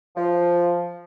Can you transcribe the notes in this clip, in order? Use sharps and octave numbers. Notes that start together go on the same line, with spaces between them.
F3